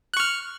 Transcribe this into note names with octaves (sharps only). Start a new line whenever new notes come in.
C#6 F6 F#6